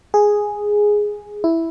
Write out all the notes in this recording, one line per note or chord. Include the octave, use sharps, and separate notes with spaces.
G#4
E4